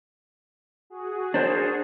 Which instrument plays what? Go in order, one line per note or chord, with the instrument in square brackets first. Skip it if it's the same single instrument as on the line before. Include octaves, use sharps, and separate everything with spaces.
[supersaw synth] F#4 G#4
[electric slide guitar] D4 C5